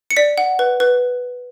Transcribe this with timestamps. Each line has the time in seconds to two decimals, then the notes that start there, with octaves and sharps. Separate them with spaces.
0.10 C#7
0.16 D5 B6
0.38 F#5
0.59 B4
0.80 B4